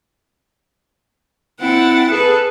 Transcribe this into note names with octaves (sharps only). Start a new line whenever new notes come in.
C4 E4 F#5 G5 A6
G#4 A4 B4